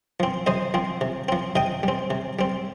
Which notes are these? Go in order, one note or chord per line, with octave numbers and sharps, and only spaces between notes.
F3 C4
C3 C5 D#5
F3 C4
C3
F3 C4
C3 D#5 G5
G3 C4
C3
G3 C4